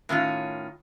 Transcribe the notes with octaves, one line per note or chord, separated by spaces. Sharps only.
A2 D#3 C#4 F4